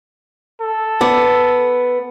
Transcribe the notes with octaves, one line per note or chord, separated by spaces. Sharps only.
A4
B3 D5